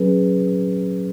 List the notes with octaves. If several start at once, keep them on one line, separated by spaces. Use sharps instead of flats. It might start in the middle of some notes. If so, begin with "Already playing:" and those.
Already playing: F#3 C#4 G#4 B4